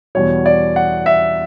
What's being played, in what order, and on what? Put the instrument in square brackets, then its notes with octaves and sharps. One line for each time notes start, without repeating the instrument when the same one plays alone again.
[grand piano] E2 B2 G3 C#5
D5
F#5
E5